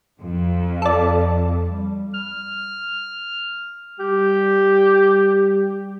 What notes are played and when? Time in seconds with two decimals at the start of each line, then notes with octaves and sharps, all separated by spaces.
0.22 F2
0.82 A4 D5
1.68 G3
2.14 F6
3.99 G3 G4